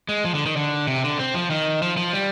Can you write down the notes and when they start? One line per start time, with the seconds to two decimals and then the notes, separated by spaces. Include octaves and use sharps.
0.09 G#3
0.25 F3
0.35 D3
0.46 D#3
0.56 D3
0.88 C3
1.04 D3
1.19 C4
1.35 F3
1.50 D#3
1.82 F3
1.97 F3
2.13 G3